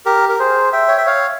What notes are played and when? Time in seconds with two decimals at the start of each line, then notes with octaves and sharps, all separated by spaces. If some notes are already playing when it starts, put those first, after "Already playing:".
0.06 G4 A#4
0.29 A#4
0.39 G#4 C5
0.73 E5 G5
0.88 C#5
0.97 E5
1.06 C#5 F5